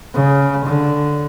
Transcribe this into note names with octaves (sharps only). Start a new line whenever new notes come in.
C#3
D3